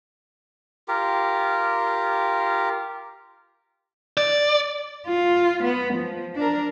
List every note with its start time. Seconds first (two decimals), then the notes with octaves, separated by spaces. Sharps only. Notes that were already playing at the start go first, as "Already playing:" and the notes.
0.88 F4 G4 A#4
4.17 D5
5.07 F4
5.64 B3
5.94 F3
6.36 D4 A#4